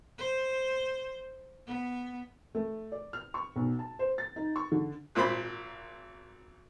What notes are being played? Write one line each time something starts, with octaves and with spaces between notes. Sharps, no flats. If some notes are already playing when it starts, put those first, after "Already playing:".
C5
B3
A3
D5
F6
C#6
B1
A5
C5
A6
D#4
C#6
D3
G#1 A#2 C5 B5